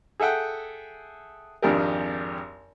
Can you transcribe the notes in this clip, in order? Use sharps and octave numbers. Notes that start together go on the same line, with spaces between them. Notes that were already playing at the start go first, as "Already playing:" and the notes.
G#4 A4 E5 F#5 G5
G#1 F2 D4 G4 G#4 A#4